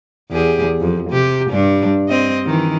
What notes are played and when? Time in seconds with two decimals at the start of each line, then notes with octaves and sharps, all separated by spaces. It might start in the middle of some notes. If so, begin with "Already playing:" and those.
0.31 E2 G4 G#4
0.80 F2
1.11 C3 G4
1.51 G2 D4
2.09 C4 D#5
2.46 D#3 E3